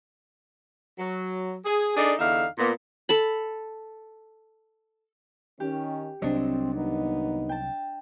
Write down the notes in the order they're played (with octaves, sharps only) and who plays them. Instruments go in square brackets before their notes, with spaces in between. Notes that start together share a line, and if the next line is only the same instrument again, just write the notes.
[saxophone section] F#3
G#4
D4 D#4 G#4 A4 D5
E2 D3 D#4 E5 F5
A#2 B3
[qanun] A4 A5 B5
[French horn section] D#3 C#4 [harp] G4
[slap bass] C2 F#3 [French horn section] C4 [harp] D4 D#5
[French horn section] D#2 B3 D#4
[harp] G5 A5